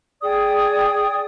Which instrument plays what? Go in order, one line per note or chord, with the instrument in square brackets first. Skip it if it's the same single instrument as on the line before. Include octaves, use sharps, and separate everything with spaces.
[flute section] G#4 D5 G5 D#6